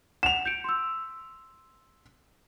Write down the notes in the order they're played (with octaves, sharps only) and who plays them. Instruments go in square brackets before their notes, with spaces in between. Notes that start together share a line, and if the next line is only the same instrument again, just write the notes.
[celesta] F#5 [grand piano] E7 F7
[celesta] G6 C#7 D7
C6 E6